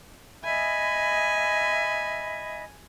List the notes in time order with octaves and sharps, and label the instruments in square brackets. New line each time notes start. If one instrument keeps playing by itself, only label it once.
[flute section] D#5 E5 B5 [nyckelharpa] G#5